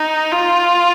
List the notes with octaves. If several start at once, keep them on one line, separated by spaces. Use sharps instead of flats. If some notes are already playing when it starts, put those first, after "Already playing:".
Already playing: D#4
F4